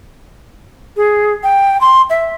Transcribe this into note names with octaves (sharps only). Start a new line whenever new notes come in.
G#4
G5
C6
E5